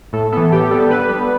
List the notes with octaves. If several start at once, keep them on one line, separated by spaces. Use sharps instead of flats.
A2 A4
E3 B3 A4
A2 G4
G3 B3 A4
D3 B4
G3 B3 B4